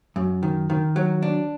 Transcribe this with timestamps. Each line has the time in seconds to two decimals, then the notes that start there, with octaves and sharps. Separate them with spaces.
0.16 F#2
0.43 D#3
0.70 D#3
0.96 F#3
1.22 D4